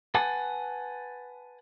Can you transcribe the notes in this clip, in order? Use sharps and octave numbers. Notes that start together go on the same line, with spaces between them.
B4 F#5 G#5 A5